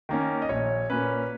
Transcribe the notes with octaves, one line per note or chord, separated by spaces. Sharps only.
D#3 A#3 C#4
D#5
A#1 C#5
A#2 A#3 C#4 B4